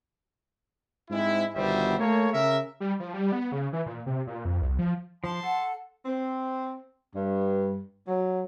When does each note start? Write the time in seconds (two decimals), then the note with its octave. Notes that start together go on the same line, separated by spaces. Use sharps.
1.11 G#2 G#3 C4 E4
1.55 G1 B2 D#3 G3 C5 E5
1.98 A3 A#3 A4 C#5
2.33 C#3 A#4 E5
2.80 G3
3.00 F3
3.14 G3
3.32 B3
3.52 C#3
3.73 E3
3.86 A#2
4.06 C3
4.27 A#2
4.45 F2
4.62 C2
4.79 F3
5.24 F3 A5 C6
5.43 A4 F#5
6.06 C4
7.15 G2
8.08 F#3